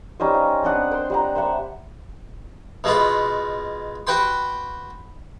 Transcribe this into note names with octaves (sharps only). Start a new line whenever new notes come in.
G3 C#4 D#4 C5
F5
C4 D4 F#5 D#6
C5 G5 C6
G3 F#5 A#5
C5 E5 F#5 B5
B2 G#3 F4 B4
F#4 B4 G5 C6